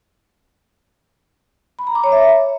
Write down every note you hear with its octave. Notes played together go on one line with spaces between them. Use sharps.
B5
A#5
D6
C#5
E5